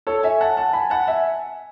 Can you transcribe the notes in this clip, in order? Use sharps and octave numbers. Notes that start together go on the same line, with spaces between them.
A4 C#5
E5 G#5
F#5 A5
F#5 A5
G#5 B5
F#5 A5
E5 G#5